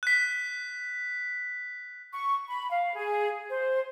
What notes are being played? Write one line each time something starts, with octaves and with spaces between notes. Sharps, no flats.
F#6 B6
C#6
B5
F5
G#4
C5